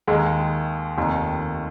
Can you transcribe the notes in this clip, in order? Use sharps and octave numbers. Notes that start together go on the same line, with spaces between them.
D#2 D#3 G#3
F1 D#2 D#3